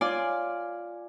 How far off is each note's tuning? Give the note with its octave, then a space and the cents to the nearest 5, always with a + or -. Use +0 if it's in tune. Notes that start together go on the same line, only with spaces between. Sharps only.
F4 +0 D5 +0 G#5 +0